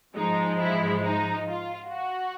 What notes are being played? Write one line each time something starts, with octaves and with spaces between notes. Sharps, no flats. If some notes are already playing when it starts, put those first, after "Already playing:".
G#2 F3 G#3 D#4
E4
D#4
F4
F#4